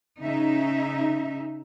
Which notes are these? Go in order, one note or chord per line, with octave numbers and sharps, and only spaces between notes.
C#3 D#4 E5